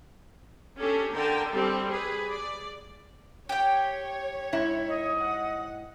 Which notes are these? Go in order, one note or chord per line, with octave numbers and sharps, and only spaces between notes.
C#4 D4 G4 A4
D3 A#4 G5 A5
G3 C4 A4
G#4 B4
D5
G4 C#5 G5
G#2 E4
D#5
F#5